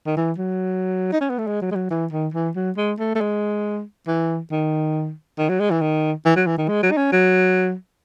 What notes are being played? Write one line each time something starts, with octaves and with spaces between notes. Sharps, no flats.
D#3
E3
F#3
D#4
C#4
B3
A3
G#3
F#3
G#3
F#3
E3
D#3
E3
F#3
G#3
A3
A3
G#3
E3
D#3
D#3
F#3
G#3
E3
D#3
E3
F#3
E3
D#3
G#3
F#3
D#4
C#4
F#3